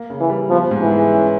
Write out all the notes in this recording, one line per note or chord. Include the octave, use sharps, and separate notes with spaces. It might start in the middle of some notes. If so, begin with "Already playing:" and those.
Already playing: A#3
C#3
E3
G3
F3 B3
G#2
E3
G#3
C#4